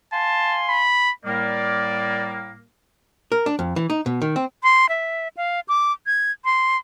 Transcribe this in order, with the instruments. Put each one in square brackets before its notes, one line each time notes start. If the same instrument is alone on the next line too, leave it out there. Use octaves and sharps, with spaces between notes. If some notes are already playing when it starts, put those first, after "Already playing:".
[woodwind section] F5 G#5 C6 [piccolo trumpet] A5
[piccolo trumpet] B5
[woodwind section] A2 G3 A#3 [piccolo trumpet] D5
[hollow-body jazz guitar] A#4
D4
F2
E3
D#4
B2
D#3
C4
[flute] C6
E5
F5
D6
G#6
C6